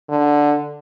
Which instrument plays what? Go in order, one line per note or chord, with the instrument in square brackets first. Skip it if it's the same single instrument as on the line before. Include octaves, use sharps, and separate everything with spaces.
[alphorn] D3